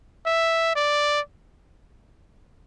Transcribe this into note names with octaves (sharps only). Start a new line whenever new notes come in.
E5
D5